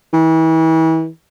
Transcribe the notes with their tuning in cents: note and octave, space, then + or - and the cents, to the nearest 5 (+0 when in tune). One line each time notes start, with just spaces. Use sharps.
E3 -35